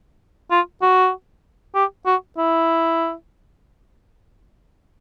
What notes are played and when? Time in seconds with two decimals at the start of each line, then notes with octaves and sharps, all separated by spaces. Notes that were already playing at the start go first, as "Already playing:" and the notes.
0.51 F4
0.82 F#4
1.75 G4
2.06 F#4
2.37 E4